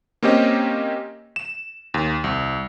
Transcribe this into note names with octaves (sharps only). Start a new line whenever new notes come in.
A#3 C4 C#4 G4 D#5
E7
D#2
C2